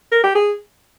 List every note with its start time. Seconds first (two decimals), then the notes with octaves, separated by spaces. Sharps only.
0.12 A#4
0.23 G4
0.35 G#4